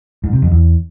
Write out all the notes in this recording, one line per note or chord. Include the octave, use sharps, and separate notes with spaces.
G#2
C3
F2
E2